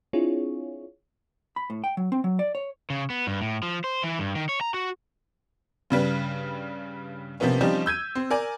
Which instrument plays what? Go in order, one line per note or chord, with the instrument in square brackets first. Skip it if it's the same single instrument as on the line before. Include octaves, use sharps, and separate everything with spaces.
[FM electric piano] C4 D4 E4 F4 G#4 C#5
[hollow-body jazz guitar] B5
A2
G5
F#3
C4
F#3
D5
C#5
[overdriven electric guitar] C#3
B3
G2
A2
F3
C5
E3
G2
D#3
C#5
A#5
F#4
[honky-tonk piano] G2 C#3 G3 B4
C3 F3 A#3 B3 C#4
F3 G3 C4 C#4 D#4 G4
E6 G6 G#6 D#7
C4
A#4 D5 G#5